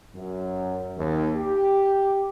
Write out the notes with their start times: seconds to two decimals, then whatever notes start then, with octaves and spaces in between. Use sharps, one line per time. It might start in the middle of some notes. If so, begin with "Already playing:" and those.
0.15 F#2
0.97 D#2
1.36 G4